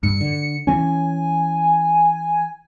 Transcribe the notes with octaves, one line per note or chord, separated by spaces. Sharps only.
G2 C#7
D3
E3 C#4 G#5